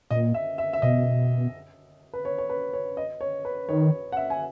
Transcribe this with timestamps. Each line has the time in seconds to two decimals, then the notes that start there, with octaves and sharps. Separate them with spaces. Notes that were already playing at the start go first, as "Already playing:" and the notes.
0.11 A#2 D#5
0.34 E5
0.58 E5
0.73 E5
0.82 B2 D#5
2.13 B4
2.25 C#5
2.38 C#5
2.49 B4
2.73 C#5
2.97 D#5
3.21 C#5
3.45 B4
3.69 D#3 C#5
4.12 F#5
4.17 E5
4.30 G#5